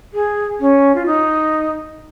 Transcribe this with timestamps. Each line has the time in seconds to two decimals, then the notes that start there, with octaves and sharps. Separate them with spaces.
0.14 G#4
0.60 C#4
0.95 F4
1.06 D#4